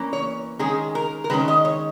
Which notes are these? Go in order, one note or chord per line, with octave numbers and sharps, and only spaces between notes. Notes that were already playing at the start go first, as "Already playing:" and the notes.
Already playing: E3 A#3 C#4
C#5
D#3 G#3 C#4 G#4
A#4
A#4
D#3 G#3 C#4 B4
D#5
C#5